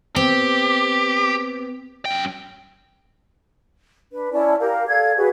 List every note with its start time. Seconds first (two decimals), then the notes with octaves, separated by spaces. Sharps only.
0.16 B3 C4 G4
2.05 F#2 G5
4.13 D4 B4
4.32 C#4 E4 D5 A5
4.59 G4 A#4 F5
4.88 A4 D5 F5 G#6
5.17 F#4 G#4 B4